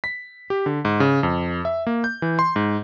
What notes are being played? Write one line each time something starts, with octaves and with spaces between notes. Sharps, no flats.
B6
G4
D3
G#2
C#3
F2
E5
A#3
G6
E3
C6
G#2